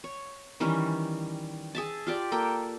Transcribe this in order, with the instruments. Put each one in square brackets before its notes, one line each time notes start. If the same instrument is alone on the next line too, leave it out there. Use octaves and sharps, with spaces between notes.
[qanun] C#5
D#3 E3 G3 C#4
G#4 E5 A5
F4 G4 D5
A#3 A4 G5